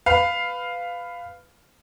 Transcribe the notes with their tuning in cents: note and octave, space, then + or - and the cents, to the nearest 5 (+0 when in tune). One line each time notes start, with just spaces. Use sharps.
B4 +15 F5 +0